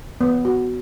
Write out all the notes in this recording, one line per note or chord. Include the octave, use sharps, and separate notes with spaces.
B3
F#4